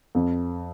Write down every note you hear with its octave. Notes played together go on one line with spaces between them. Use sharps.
F2